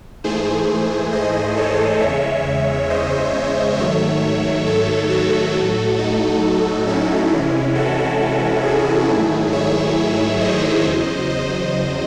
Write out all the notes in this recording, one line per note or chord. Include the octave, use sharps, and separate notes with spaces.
G#2 E3 A3 G#4 C5
C5 D#5
A4 C#5
E2 C#3 G#3 C#5 E5
C5 D#5
G#2 D#3 F#3 A3 C#5 E5
A4 C#5
F#4 A4
A2 F#3 A3
D#4
C#4 E4
C3 E3 G#3
F#4 A4
E4 G#4
G#2 D#3 F#3 A3
C#5 E5
C5 D#5
E2 C#3 F#3
C5 D#5